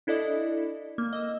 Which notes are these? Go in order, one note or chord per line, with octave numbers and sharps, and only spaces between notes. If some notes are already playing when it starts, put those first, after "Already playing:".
D4 E4 A4 D5 D#5
A#3
D#5 E6